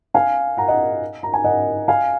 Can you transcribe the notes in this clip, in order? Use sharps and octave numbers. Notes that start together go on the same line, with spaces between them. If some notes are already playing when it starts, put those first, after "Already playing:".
F5 G#5
F#5 A#5
D#5 F#5
A#5
G#5
D#5 F#5
F5 G#5